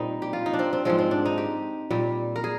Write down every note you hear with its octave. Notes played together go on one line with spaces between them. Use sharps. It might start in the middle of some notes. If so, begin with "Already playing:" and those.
Already playing: A#2 G3 C4 D#4
G4
F4
D#4
D4
C4
C4
G#2 F3 G#3 C4
C4
D4
D#4
G4
A#2 G3
A#4
G#4